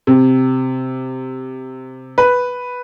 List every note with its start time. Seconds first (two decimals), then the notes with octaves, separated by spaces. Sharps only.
0.07 C3
2.18 B4